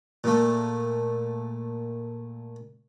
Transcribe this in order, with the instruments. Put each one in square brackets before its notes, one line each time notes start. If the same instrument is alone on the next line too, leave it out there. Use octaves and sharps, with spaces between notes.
[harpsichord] A#2 A3